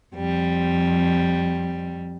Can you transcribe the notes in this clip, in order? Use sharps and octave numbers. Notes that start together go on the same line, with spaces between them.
F2 G3